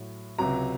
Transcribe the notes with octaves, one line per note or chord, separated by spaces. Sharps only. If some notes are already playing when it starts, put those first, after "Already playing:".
Already playing: A2 F#3
C#2 C3 F#3 A#5